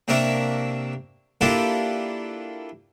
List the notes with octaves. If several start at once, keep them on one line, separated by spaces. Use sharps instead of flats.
C3 A#3 D4 A#4 E5 C#6
A#3 D4 E4 F4 G4 A4